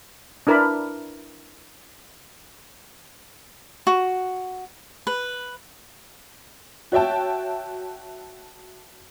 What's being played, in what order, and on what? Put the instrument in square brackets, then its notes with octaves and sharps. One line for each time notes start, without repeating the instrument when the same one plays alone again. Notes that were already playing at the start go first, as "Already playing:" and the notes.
[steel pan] D4 E4 A#4 B4 D5 B5
[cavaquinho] F#4
B4
[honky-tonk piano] F#4 C#5 E5 G5 A5